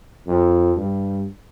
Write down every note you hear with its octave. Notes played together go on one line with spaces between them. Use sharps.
F2
G2